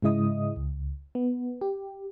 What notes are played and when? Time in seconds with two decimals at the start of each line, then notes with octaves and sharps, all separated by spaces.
0.02 G#2 C#3 G#3 E4 D#5 D#6
0.56 C#2
1.15 B3
1.61 G4